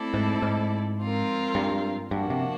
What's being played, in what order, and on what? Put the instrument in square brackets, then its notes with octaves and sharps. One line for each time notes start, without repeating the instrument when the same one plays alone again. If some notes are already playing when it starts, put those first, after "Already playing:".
Already playing: [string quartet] A3 C4 E4 A4 D5
[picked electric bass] G#2
G#2
[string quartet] F3 G#3 C4 F4 A#4
[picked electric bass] G2
[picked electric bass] G2 [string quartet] F3 A#3 D4 F#4
[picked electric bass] C3